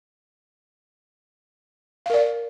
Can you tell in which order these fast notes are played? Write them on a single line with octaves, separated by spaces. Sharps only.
F5 A#4 D5